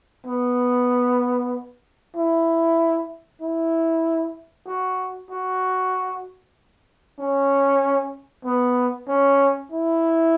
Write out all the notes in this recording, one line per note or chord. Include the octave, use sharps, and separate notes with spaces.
B3
E4
E4
F#4
F#4
C#4
B3
C#4
E4